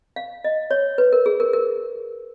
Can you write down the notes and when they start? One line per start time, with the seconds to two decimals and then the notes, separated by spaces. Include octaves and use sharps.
0.16 F5
0.44 D#5
0.71 C#5
0.98 B4
1.13 A#4
1.26 G#4
1.40 A#4
1.53 A#4